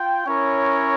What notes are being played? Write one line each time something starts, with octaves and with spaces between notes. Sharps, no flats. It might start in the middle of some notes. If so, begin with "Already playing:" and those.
Already playing: F4 G5
C#4 E4 A#4 C#5